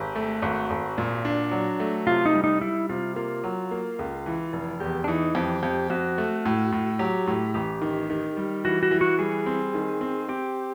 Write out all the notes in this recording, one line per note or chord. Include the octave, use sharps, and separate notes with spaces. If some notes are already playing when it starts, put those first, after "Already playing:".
Already playing: G#1 G4
A3
G#1 F#4
G#1
A#2
D4
F#3
A3
C3 F4
D#4
G3
D#4
G3 E4
C3 F4
A#3 F4
F#3
A#3
C#2
E3
F1
E2 G4
D4
E3 D#4
F2 G4
F2 G4
F2 F#4
A3
A2
A2
F#3 G4
A2
A1 G4
D#3
D#3
G3
E3 F#4
F#4
E3
F#4
G3 G#4
C4
D#3
C4
C4 G4